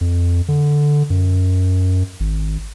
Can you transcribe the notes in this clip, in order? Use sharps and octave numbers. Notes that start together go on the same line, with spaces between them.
F2
D3
F#2
G#1